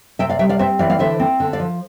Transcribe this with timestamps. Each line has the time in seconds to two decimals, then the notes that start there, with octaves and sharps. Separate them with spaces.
0.19 C3 E5 G5
0.29 D5 F5
0.39 G3 E5 G5
0.49 D5 F5
0.59 C4 C5 E5
0.79 E3 D5 F5
0.89 D5 F5
0.99 D3 C5 E5
1.20 C4
1.40 D3
1.53 D5 F5
1.60 F3